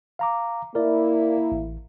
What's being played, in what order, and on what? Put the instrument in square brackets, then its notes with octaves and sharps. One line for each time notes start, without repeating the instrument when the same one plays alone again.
[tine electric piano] F5 A#5 D6
[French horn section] A#3 E4 [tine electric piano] A#4 D5
[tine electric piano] A1